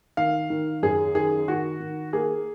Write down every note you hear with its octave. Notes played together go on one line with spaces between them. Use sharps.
D#3 F5
D#3
F#2 G#4
D#3 G#4
D#3 F#4
D#3
A#3 G#4